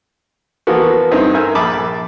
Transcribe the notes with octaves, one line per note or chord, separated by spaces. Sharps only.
E3 F3 A#3 B3 F#4
G2 C4 D#4 E4 D#5
A#4 C5 E5 G#5
A#1 A5 B5 D6 D#6